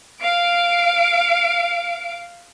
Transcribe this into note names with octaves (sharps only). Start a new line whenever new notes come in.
F5 D7